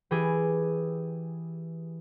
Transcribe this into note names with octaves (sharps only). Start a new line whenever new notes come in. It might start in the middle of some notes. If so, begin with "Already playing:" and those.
E3 G4 G#4